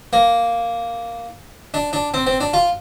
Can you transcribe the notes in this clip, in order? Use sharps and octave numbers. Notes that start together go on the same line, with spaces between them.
A#3
D4
D4
C4
C4
D4
F4